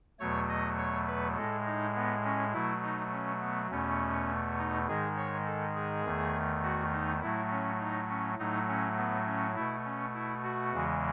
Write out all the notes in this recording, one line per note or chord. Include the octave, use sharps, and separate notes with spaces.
E2 B2 F#3 A3 C#5
D#5
C#5
B4
A2 G#3 A4
D#4
B3
C#4
B2 F#3 A3 E4
D#4
C#4
B3
E2 B2 A3 C#4
D#4
G#2 D#3 G#3 G#4
C#5
A4
G#4
E2 D#3 A3
F#4
D#4
A2 F#3 A3 E4
C#4
D#4
C#4
A2 F#3 A3 D#4
C#4
B3
C#4
B2 A3 E4
C#4
E4
F#4
E2 C#3 E3 G#3